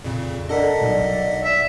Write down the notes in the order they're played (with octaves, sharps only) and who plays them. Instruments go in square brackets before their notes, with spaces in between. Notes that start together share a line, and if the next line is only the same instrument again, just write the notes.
[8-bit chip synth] F2 A#2 C#3
[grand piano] D4 A4 A#4 [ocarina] D5 [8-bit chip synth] D#5 F#5 B6
[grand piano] B1 [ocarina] D5
[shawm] E5